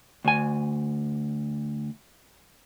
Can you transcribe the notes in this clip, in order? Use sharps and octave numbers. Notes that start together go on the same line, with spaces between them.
D2 G#5